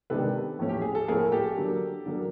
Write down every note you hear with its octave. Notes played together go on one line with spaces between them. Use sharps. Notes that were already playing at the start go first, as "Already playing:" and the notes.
C3 D#3 G#3 B3 D4 A4 B4
A2 F3 A3 C#4
G4
G#4
A4
A2 F3 A3 C#4 G#4 A#4
G4 A4
D3 F#3 A#3
D3 F#3 A#3